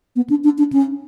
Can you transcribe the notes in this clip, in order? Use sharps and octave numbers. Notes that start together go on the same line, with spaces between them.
B3
D4
D4
D4
C#4